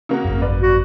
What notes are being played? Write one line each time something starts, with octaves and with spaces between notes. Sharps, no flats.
C#3 A#3 F#4
G#1 F#2
B4 D5
F#4